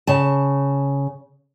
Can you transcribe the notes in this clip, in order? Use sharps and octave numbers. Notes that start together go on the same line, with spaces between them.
C#3 A5